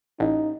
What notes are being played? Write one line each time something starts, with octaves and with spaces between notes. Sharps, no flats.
A1 D#4